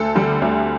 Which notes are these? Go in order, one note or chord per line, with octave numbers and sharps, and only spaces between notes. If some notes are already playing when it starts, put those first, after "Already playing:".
Already playing: D2 A4
D3 G3
D2